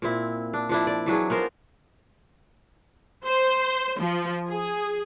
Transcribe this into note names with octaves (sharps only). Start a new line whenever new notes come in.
A#2 C4 E4
D4
F3 D4 E4
D5
E3 F#3 D4 G#4
B3 F4 A#4 C5
C5
F3
G#4